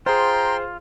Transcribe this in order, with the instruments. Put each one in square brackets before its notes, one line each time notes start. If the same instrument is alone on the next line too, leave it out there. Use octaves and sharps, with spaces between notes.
[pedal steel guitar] F4 [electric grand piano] G#4 C5 [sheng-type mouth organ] G5 C6 [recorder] A#5